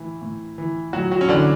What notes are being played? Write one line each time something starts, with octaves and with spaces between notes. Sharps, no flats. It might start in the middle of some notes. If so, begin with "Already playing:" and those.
Already playing: A2 E3
A2
E3
A2 F#3 F#4
F#3 F#4
C#4
D3 E3 D4